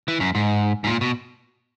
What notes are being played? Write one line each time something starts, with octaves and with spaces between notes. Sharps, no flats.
E3
F#2
G#2
G#2
A#2
B2